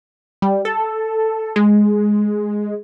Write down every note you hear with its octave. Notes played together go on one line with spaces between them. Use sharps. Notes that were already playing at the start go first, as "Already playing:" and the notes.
G3
A4
G#3